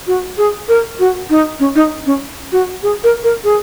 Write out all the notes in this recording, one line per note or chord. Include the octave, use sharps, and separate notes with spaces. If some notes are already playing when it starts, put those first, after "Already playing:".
F#4
G#4
A#4
F#4
D#4
C#4
D#4
C#4
F#4
G#4
A#4
A#4
G#4